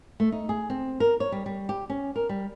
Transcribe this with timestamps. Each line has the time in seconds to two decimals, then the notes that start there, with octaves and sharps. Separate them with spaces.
0.20 A3
0.32 D#4
0.49 G#4
0.70 C4
1.00 A#4
1.20 C#5
1.32 G3
1.46 G3
1.69 G4
1.90 C#4
2.16 A#4
2.29 G3